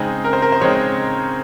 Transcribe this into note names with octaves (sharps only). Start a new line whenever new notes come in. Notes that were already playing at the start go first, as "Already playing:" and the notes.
Already playing: C#3 G#3 C4 D#4 G#4
A#4
C5
A#4
C5
C#3 G#3 C4 D#4 C#5